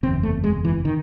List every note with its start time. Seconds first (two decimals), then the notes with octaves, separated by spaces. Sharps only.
0.03 F#1 E2 C3 C4
0.23 A3
0.44 G#3
0.65 E3
0.85 D#3